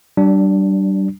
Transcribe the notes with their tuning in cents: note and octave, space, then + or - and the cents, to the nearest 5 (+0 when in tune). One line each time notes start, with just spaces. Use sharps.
G3 -30 D4 +0